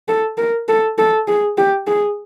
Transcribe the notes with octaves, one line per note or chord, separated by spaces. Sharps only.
A4
A#4
A4
A4
G#4
G4
G#4